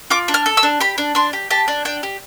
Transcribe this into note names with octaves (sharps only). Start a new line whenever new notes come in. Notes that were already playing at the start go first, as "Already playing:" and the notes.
F4 D6
D4
F6
A4
E6
D4
G4 B5
D4
D4 C6
G4
G4 A5
D4
D4 G5
G4